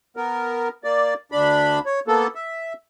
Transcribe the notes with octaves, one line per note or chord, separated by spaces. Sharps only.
B3 A#4
A#3 D5
D2 D4 B5
C#5
A#3 B3 A4
E5